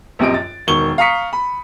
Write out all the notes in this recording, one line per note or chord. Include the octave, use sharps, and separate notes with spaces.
A#1 F#2 C3 D#5 D7
A6
E1 D#3 C#6 G7
F5 A#5 C#6 D#6 B6 C#7
B5